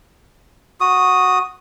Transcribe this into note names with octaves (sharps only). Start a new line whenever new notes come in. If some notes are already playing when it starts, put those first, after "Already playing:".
F#4 D#6